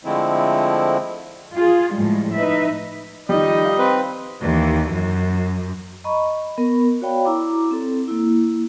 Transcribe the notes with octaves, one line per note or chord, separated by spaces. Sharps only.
D3 F3 G#3 A3 C4 E4
F4 G#4
A2 F3 G3 G#3
D#4 B4 D#5 E5
F2 D#3 G3 D#4 D#5
F5
C4 B4
D#2 E3
F#2
D#5 A#5 B5 C#6
B3 A#4
F#4 C#5 D5 F5 G5 B5
E4 A#5 D6
C4 A4
A#3 E4